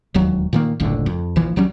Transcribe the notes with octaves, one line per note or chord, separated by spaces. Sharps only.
E1 D#2 F#3
A#2 D#3 A#3
F#1 C#2 A2 D3
F2
A#1 E3 F3
B1 F#3 G3 C#4